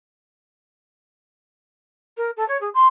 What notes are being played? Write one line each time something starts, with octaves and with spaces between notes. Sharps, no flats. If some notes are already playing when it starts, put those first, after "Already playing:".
A#4
A4
C#5
G#4
C6